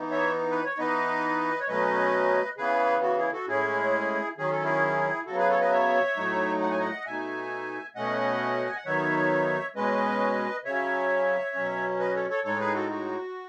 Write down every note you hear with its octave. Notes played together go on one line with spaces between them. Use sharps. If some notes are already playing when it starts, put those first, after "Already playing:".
Already playing: E3 B3 D#4
C#5 E5
B4
C#5
E3 B3 D#4 B4 D#5
C#5
B2 F#3 A3 C#4 B4 D#5
C#3 E3 B3 G#4 B4
F#4
E4 G#4
F#4 A4
A2 G#3 C#4 E4 G#4
D#3 F#3 C#4 G#4
A4
E4 G#4
C#3 F#3 B3 F#4 A4
G#4 B4
A4 C#5
B4 D#5
C#5 E5
A2 F#3 A3 D#4
F#5
G#5
D#5 F#5
B2 A3 D#4 E5 G#5
B2 A3 C#4 D#5 F#5
G#5
F#5
D#3 F#3 B3 D#4 C#5 E5
B2 G#3 C#4 B4 D#5
C#3 F#3 C#4 C#5 E5
B2 F#3 C#4
B4 D#5
A4 C#5
A4 C#5
A2 G#3 D#4 A4 C#5
G#4 B4
F#4 A4
F#4